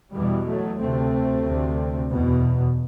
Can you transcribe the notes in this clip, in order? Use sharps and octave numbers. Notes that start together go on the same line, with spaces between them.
E2 B2 E3 G3
F#3 A3
D2 C3 A3 C4
D2 C3
E2 B2